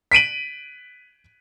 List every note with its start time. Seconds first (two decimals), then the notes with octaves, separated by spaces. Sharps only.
0.12 B6 D7 D#7 F#7